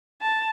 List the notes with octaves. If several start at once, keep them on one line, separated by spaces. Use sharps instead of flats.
A5